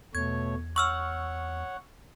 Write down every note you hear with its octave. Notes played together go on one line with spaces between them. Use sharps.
E2 B2 A3 C#5 G#6
C#5 F#5 C#6 E6 F6